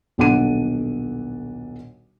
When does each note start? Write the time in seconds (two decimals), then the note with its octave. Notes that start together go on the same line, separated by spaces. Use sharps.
0.18 D#1 B1 D4 F#5 D6 D#7